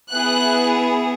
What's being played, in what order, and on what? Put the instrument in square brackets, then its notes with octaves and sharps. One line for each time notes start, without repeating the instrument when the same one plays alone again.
[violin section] B3 E4 G#4 F#6